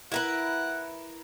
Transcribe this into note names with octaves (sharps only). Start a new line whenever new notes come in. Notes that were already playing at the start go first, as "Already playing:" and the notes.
E4 A#4 B4 F#5